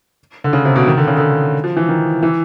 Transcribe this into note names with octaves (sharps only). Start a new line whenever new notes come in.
D3
C#3
C3
B2
D#3
D3
C#3
D3
F3
E3
D#3
E3